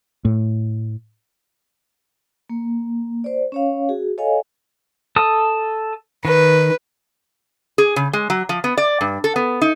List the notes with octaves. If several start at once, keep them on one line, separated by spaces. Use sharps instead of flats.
A2
A#3
C5 D5
C#4 C#5 F5
F#4 G#4
A4 C#5 D#5 F5 G#5
A4 A5 D#6
D#3 B4
G#4
C#3
G#3
F#3
F3
B3
D5
G2
A4
B3
D#4